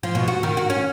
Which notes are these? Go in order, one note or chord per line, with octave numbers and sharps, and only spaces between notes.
F3
B2
F#4
D#3
F#4
C#4